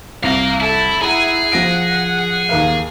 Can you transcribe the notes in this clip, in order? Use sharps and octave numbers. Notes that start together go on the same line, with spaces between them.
C2 F5 A#5
E4 A4
E4 G#4 F#5 A#5
F3 F#5 A#6 D7
D#2 A#4 F5